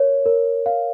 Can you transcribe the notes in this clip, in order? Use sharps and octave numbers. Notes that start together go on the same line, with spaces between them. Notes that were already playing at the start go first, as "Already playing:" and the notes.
Already playing: A#4 C#5
A#4
F5